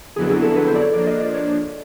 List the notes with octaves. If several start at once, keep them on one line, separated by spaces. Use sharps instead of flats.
F2 D3 F#3 B3 E4 G#4
G#4
A4
B4
C5
D5
C#5
F3 A#3 D4 D5
D#5
D5
C#5